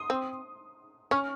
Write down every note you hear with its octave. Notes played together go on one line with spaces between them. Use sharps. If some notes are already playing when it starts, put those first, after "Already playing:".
Already playing: C6 D#6
C4
C#4 C#6 F6